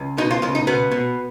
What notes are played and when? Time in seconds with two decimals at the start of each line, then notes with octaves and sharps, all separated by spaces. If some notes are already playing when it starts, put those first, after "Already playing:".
Already playing: C#2
0.18 B2 D#4
0.31 F4
0.42 C#2 F4
0.55 D#4
0.67 B2 B3
0.91 B2